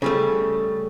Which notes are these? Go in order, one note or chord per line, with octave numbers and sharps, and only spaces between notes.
C#3 G3 A3